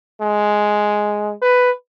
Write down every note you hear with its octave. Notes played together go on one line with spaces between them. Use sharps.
G#3
B4